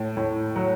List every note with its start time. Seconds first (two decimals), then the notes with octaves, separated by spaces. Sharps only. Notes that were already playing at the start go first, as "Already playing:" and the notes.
Already playing: A2
0.17 A2
0.56 F#3